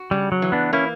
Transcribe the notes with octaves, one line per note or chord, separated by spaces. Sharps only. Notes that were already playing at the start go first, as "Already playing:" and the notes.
Already playing: F#4
C#3 G3
F#3
E3
B3 D4
A#3 C#4 E4